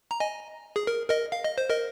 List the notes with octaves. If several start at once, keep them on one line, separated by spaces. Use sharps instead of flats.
A#5
D#5 G#5
G#4
A#4
A#4 D#5
F5
D#5
C5
A#4 D#5